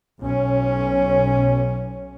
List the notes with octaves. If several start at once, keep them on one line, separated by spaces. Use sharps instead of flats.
B1 C#4